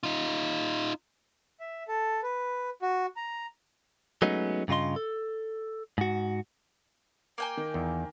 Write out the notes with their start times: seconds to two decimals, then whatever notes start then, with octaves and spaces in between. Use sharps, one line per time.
0.03 D#4 F4
1.60 E5
1.88 A4
2.23 B4
2.82 F#4
3.16 A#5
4.22 F#3 G#3 A3 B3 C#4 D#4
4.68 G2 C#3 F4 D#5 C6
4.96 A4
5.98 G#2 F#4
7.38 A#3 G5 G#5
7.57 D#3
7.74 E2